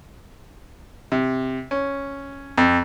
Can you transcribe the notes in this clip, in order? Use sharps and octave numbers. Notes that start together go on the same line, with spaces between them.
C3
C#4
F2